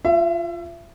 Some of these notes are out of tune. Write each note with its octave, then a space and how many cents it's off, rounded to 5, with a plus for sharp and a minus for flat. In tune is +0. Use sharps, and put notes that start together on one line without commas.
F4 -10 E5 +30